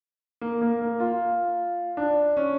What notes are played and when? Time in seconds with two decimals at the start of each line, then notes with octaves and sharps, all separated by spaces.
0.41 A#3
0.61 A#3
0.81 A#3
1.00 F4
1.97 D4
2.37 C#4